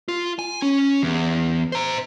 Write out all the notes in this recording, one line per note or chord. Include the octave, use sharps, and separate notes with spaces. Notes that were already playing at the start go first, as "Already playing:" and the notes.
F4
G#5
C#4
E2
C5 A#5